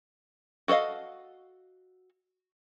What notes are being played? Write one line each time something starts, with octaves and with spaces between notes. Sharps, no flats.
F#4 A4 A#4 D#5 F5